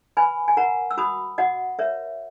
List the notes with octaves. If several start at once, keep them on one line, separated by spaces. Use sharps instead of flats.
B4 G#5 B5
G#5
A#4 F#5 A#5
E6
F#4 B5 D#6
F#4 D#5 F#5
A#4 C#5 E5